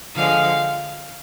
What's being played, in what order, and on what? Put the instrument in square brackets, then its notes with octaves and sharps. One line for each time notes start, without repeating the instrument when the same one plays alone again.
[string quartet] D3 F3 G#3 [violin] F5